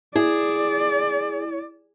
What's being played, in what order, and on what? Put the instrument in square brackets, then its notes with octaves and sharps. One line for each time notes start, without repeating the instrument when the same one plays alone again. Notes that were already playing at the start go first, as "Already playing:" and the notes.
[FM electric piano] E4 [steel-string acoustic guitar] G#4 [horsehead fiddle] D5